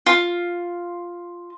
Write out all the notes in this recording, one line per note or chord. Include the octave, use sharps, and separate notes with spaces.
F4